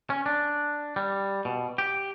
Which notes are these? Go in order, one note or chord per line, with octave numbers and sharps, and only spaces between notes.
C#4
D4
G3
B2
G4